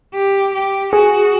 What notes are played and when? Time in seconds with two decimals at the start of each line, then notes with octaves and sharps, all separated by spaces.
0.14 G4
0.54 G4
0.93 F#4 G#4